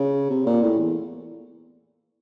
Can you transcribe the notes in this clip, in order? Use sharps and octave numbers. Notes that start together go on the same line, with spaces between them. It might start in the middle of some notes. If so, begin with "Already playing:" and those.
Already playing: C#3
C3
A#2
A2
E2